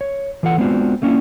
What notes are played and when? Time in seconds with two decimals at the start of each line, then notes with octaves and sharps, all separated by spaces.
0.01 C#5
0.43 E3 F4 A4 F#5
0.58 G#3 B3 C4 D4 F4 F#4
1.02 A3 A#3 C#4 D4 E4 F4